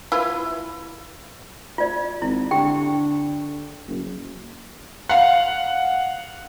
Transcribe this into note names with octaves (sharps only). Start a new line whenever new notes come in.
E4 F4 B4
F4 D5
G#1 E4
D3 G4 G5
F#1
F5 F#5